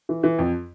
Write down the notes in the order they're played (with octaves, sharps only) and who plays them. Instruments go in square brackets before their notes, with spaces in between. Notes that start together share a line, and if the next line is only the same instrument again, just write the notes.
[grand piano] E3
E3
F2